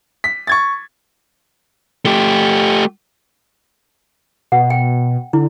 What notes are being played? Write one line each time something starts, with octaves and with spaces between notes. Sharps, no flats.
B6
C#6 G#6 A6
A3 G4
B2 F#5
G5
D3 E4